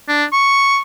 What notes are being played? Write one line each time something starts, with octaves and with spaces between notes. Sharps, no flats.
D4
C#6